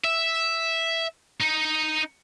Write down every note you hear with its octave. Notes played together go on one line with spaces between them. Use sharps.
E5
D#4